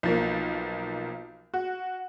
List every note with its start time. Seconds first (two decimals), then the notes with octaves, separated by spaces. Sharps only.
0.03 B1 F3 A#3
1.54 F#4